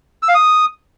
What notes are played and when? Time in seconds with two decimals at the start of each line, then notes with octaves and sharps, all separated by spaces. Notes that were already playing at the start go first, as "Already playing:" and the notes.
0.22 E6
0.28 F5
0.34 D#6